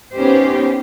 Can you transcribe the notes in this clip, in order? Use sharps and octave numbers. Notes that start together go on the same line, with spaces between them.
B3 C#4 D#4 G4 C5